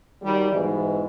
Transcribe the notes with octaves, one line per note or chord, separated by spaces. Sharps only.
D#3 F#3 G3
G#2 B2 E3 E4